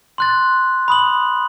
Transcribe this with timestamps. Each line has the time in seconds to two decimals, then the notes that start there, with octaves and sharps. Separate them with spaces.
0.18 C6 F#6 A6
0.88 B5 D#6 F#7